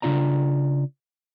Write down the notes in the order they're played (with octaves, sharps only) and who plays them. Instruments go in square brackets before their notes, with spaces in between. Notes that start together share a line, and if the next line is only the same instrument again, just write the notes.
[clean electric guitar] C#3 D4 F4 D5 A#5